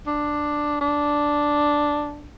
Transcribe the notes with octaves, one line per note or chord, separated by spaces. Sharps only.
D4
D4